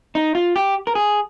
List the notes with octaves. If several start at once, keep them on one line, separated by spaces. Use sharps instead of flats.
D#4
F4
G4
A#4
G#4